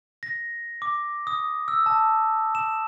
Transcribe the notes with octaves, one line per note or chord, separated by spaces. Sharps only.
A#6
D6
D#6
E6
A5
E7